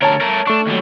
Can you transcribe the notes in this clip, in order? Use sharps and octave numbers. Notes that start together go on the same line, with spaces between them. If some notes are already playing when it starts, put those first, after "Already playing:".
D2 A#4 C#5 A5
A3 A#4
A3 D4 C#6
D#2 F#3